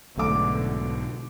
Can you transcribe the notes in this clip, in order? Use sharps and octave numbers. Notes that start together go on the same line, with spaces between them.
B1 G#2 B2 D3 A3 D6